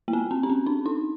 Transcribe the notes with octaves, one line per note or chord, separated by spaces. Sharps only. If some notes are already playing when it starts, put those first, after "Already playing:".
A#3
B3
C4
C#4
C4
D4
D#4